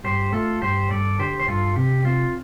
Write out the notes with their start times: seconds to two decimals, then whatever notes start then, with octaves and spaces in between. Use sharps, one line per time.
0.04 G2 G4 C5
0.33 A3 F4 A4
0.61 G2 G4 C5
0.91 G2 A4 D5
1.19 D3 G4 C5
1.40 C5
1.48 G2 F4 A4
1.76 C3 G4
2.05 C4 F4